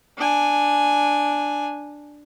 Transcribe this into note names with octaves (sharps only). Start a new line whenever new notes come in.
D4 G#5